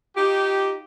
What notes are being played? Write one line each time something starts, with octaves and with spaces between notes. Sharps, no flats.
D#4 F4 G4